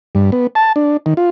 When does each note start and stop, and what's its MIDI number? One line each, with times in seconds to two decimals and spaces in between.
0.15 0.31 43
0.32 0.47 59
0.55 0.72 81
0.76 0.97 62
1.06 1.14 51
1.17 1.30 65